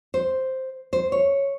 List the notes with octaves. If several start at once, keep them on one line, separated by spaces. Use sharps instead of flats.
C5
C5
C#5